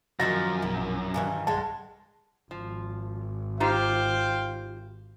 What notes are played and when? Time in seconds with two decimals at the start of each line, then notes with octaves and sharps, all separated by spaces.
0.20 F#2 D#3 F3 F#4 D#5 E5 A6 A#6
0.62 A#1 B2 E4
1.14 G2 D#3 E3 G#5
1.47 B1 G2 G#3 F#5 A5
2.51 G#1 F3
3.60 D#4 F4 G4 C5 F5 G5